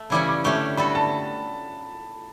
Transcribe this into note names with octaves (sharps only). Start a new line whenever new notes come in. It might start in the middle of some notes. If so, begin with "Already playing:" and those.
Already playing: A3
C#3 E3 G3 C#4 E4 D6
D6
D3 A3 C#4 G4 C#6
G3 B3 F#4 A4 B5
A5